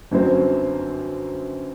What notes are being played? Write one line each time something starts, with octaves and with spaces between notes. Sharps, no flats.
G1 F#2 F#3 C4